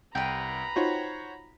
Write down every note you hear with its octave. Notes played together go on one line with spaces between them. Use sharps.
C2 B4 G5 A#5 B5
D#4 F4 F#4 C5 C#5 F#5